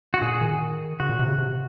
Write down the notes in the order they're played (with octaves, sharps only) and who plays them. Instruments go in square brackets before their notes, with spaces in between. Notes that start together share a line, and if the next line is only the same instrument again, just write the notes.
[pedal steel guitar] F#4
[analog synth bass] A#2 [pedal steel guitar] G#4
[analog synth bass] D#3
[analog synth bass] C#3 [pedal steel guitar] F#4
[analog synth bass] A#2
C3
C#3
C3